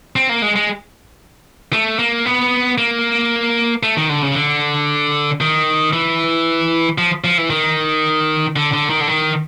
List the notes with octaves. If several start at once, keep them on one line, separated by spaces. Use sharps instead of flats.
C4
A#3
G#3
G#3
A3
A#3
B3
A#3
A3
D#3
D3
C#3
D3
D#3
E3
F3
F3
E3
D#3
D3
D3
D#3
D3
D#3